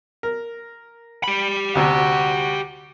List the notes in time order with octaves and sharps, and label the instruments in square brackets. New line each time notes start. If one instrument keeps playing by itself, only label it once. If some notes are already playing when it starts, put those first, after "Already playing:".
[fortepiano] A#4
[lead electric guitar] G4 B5
[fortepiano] D2 C3 [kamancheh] F#4